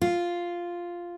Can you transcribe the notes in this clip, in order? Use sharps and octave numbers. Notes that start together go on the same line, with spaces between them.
F4